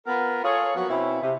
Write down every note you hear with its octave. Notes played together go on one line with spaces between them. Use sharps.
B3 F4 A#4
F4 G#4 A4 C#5
F3 F#3 A#3 B3 F#4
B2 C4 C#4 E4
C3